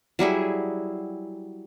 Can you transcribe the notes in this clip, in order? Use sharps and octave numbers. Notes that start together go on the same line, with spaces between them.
F#3 G3 E4 G#4